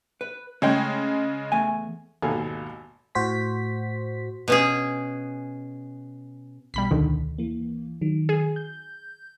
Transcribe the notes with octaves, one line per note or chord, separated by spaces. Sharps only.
B4
C#3 G#3 A3 C#5 G5
E2 A3 G#5
G#1 D#2 B2 A4 F5 G#5
A2 F#4 C5 B6
B2 C#4 G#4
B1 B2 G3 B5 B6
D2 D3 D#3
E3 A#3
D#3 F#3
G#4
G6